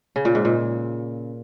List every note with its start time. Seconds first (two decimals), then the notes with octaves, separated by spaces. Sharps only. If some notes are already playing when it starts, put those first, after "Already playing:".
0.16 C#3
0.25 A#2
0.35 G#2
0.45 A#2